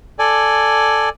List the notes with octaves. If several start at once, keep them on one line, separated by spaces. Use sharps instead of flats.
A4 D5 G#5